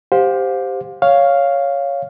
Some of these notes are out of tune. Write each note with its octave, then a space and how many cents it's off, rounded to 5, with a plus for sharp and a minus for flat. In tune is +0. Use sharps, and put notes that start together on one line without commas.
G4 +0 C5 -5 F5 +30
C#5 +5 F5 +0